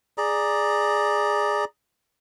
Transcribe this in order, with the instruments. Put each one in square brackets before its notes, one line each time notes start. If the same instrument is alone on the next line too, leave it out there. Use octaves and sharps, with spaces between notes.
[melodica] G#4 D5 A#5